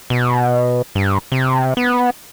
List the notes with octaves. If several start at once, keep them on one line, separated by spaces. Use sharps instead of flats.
B2
G2
C3
B3